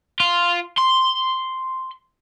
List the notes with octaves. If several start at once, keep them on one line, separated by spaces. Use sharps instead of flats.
F4
C6